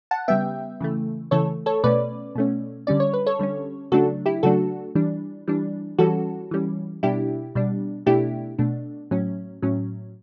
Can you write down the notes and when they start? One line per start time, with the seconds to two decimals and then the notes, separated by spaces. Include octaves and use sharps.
0.11 F#5 A5
0.28 C#3 G3 B3 E5 G5
0.80 C#3 E3 A3
1.31 C#3 E3 A3 A4 C#5
1.66 A4 C#5
1.84 B2 A3 C#4 B4 D5
2.35 B2 A3 C#4
2.87 D3 G3 C#4 D5
3.00 C#5
3.14 B4
3.26 A4 C#5
3.39 D3 G3 C#4
3.92 C#3 F#3 A3 D4 F#4 A4
4.26 E4 G4
4.43 C#3 F#3 A3 D4 F#4 A4
4.95 E3 G3 D4
5.47 E3 G3 D4
5.99 E3 G3 C#4 F#4 A4
6.51 E3 G3 C#4
7.03 B2 G3 D4 E4 G4
7.55 B2 G3 D4
8.06 B2 A3 D4 E4 G4
8.58 B2 A3 D4
9.11 A2 F#3 C#4
9.62 A2 F#3 C#4